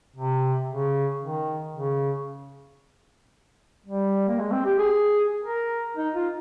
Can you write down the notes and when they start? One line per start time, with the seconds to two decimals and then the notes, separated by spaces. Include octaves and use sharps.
0.16 C3
0.69 C#3
1.22 D#3
1.74 C#3
3.86 G3
4.28 A#3
4.39 G#3
4.51 C4
4.65 G4
4.79 G#4
5.44 A#4
5.97 D#4
6.15 F4